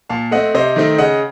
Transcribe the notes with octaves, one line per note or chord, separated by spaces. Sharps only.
A#2 F5 A5
A3 C4 D#5 F#5
C3 C5 D#5
D#3 A3 C4 D#4
C#3 D#5 F#5